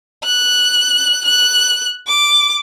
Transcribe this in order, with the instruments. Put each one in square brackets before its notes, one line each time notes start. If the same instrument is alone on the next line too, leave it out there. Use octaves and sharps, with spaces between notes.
[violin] F#6
F#6
D6